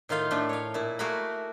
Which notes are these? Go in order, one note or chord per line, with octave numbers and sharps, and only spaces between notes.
A2 D#3 F4 F5 B5
A2 A3 D4 E5
C#5 F5
A#2 E4
A3 A#3 F#4 G#4 A#4 B5